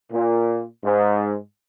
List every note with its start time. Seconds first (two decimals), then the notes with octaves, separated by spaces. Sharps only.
0.12 A#2
0.84 G#2